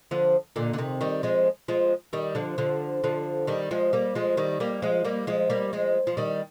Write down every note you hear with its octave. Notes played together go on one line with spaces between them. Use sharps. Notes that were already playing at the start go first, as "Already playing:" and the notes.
D3 F3
A#2 D3
D3
C3 D#3
D#3 G3
F3 G#3
F3 G#3
D#3 G3
D3 F3
D3 F3
D3 F3
D#3 G3
F3 G#3
G3 A#3
F3 G#3
D#3 G3
G3 A#3
F3 G#3
G3 A#3
F3 G#3
G3 A#3
F3 G#3
F3
D#3 G3